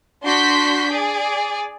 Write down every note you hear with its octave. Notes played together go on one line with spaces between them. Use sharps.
D4 F#4 C6 G6 B6
G#4 D5